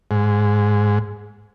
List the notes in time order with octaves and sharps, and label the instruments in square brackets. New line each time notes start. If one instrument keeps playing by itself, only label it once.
[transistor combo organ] G#2